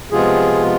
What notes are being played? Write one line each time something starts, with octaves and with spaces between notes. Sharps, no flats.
C3 F3 G#3 B3 F4 G#4